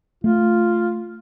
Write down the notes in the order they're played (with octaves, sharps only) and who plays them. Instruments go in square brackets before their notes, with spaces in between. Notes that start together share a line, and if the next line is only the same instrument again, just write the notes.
[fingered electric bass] A3 [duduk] F4